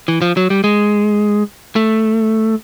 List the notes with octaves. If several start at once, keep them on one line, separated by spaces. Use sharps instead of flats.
E3
F3
F#3
G3
G#3
A3